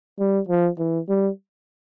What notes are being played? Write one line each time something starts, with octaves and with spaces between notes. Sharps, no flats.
G3
F3
E3
G3